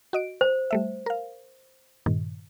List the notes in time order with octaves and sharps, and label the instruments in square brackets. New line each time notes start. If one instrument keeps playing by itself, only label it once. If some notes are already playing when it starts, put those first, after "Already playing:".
[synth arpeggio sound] F#4 D#5 D7
[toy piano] C5
[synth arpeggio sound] G3 A3 E5
A#4 F5
G2 A#2 D#3